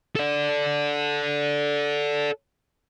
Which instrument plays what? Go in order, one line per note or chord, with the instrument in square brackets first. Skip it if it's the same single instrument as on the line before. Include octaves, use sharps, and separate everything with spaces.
[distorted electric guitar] A4 D5